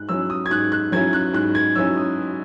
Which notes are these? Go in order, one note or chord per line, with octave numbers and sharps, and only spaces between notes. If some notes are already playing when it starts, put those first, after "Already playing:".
Already playing: G#2 F#6
F#3 C#4 E4 E6
D#6
G#6
G#2 F#6
F#6
F#3 C#4 E4 G#6
F#6
G#2 F#6
G#6
F#3 C#4 E4 E6
D#6